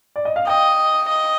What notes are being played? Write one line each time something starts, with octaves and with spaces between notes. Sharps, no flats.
D5
D#5
F5
D#5 G5
D#5